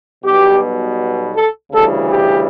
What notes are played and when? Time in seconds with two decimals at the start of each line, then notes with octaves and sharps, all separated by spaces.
0.24 B1 B2 G3 B3 G4
1.35 A4
1.72 D2 C#3 E3 G3 A4
2.09 G4